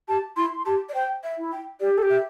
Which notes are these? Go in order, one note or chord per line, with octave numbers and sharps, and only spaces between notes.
G4 A5
E4 C6
C6
G4 A5
D5
C5 G5
E5
E4
G5
G4 D5
A4
G4
E5